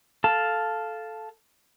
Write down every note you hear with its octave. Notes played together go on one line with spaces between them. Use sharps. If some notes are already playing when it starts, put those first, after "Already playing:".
A4 F5 A5